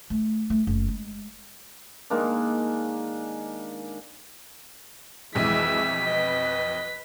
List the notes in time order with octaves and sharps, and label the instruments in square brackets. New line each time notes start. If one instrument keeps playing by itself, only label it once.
[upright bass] A3
A3
F#1
G#3
[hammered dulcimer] D#3 G#3 A#3 D4
[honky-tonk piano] B1 F2 [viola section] E3 G#3 E5 [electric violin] B6
[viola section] B4 [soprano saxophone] D#5